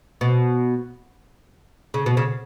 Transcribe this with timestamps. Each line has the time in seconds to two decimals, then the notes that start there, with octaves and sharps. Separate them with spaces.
0.21 B2
1.94 C#3
2.06 B2
2.17 C#3